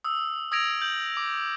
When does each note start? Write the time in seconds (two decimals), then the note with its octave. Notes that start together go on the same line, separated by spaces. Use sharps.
0.04 D#6 E6
0.52 D#6 E6 G#6 A#6 D7 F7
0.81 G6 F#7
1.17 D6